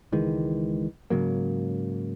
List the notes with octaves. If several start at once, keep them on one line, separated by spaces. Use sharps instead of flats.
C#2 D#3 E3 G#3
G#2 C#3 F#3 A#3